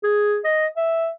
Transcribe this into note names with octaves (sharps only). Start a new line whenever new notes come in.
G#4
D#5
E5